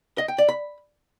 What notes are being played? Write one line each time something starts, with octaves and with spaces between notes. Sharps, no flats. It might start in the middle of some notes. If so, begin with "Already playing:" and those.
D#5
G5
D5
B5